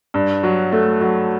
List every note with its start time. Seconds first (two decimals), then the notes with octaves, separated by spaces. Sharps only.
0.14 G2
0.43 F#3
0.72 A3
1.01 F#3